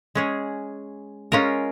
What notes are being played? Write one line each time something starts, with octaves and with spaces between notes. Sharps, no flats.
G#3 C#4 G#4
G#3 C#4 F4 A#4